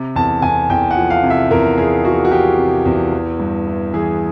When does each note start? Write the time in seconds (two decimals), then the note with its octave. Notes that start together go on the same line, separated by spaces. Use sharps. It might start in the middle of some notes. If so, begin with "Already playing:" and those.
Already playing: C3
0.16 E2 A5
0.42 E2 G#5
0.69 E2 G5
0.91 F#5
0.97 F3
1.10 F5
1.23 C3
1.30 E5
1.51 E2 A#4
1.78 E2 G#4
2.05 F3 F#4
2.25 F#4
2.32 F3 G4
2.58 C3
2.85 E2
3.13 E3
3.40 G2
3.67 E3
3.94 E3 G#4